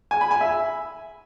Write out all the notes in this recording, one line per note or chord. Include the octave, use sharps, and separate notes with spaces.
G#5
B5
G#5
E5